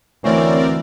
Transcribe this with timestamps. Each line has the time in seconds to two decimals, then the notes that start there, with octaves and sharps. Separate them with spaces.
0.24 D2 E3 C4 C#4 A#4 D5